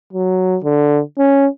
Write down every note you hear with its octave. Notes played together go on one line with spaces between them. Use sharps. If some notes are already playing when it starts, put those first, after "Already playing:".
F#3
D3
C#4